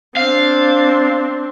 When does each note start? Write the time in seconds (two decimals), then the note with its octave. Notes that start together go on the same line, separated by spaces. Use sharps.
0.16 C4 D4 F5